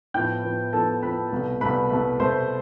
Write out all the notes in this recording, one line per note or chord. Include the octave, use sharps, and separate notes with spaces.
A2 F3 B3 G5 G6
A2 F3 B3
A2 F3 B3 A4 A5
A2 F3 B3 B4 B5
C2 B2 A3
C2 B2 A3 B4 B5
C2 B2 A3
C2 B2 A3 C5 C6